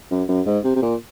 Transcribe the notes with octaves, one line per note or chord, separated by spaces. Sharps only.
F#2
F#2
G#2
C3
C3
A#2